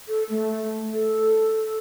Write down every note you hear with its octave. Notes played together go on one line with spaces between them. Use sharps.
A4
A3
A4